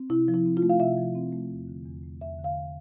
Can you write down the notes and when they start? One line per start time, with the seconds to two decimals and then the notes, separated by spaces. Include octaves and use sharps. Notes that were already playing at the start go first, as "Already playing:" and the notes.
Already playing: C4
0.10 C3 E4
0.28 F3
0.34 E4
0.45 C4
0.57 F4
0.62 A3
0.69 F5
0.80 C3 E5
0.97 F3
1.15 C4
1.33 A3
1.50 E2
1.68 D3
1.85 E2
2.03 A3
2.21 E2 E5
2.39 D3
2.44 F5